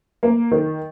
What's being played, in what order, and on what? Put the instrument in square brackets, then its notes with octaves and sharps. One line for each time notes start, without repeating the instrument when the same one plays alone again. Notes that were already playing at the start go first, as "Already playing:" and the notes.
[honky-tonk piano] A#3
D#3